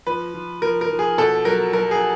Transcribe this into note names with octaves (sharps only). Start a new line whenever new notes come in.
F3 B4
F3
F3 A#4
A#4
F3
G#4
B2 A4
F#3 A#4
F#3 A#4
G#4